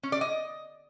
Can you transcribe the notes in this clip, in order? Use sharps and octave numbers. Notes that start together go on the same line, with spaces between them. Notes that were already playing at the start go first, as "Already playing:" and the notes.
C#4
D5
D#5